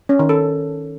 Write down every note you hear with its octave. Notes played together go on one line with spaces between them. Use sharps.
C#4
D#3
A4